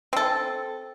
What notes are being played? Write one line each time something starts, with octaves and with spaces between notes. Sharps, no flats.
C4 A4